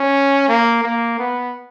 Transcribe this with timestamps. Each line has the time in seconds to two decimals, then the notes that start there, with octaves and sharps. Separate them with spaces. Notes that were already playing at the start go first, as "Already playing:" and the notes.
Already playing: C#4
0.48 A#3
0.83 A#3
1.19 B3